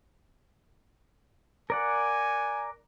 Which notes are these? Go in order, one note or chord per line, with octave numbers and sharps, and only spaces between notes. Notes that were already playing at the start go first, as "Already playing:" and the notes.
A#4 D5 F#5 G#5